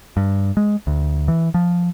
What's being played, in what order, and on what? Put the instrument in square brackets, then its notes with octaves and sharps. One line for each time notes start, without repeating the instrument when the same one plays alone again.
[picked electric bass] G2
G#3
D2
E3
F3